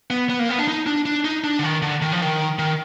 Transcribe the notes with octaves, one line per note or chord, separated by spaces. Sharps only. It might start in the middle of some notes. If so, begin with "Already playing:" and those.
B3
B3
A#3
B3
D4
D#4
D4
D4
D#4
D4
D3
D#3
D3
D#3
F3
D#3
D#3